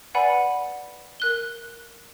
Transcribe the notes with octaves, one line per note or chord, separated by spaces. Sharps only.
B4 D5 F#5 G#5 B5
A#4 F#6 G7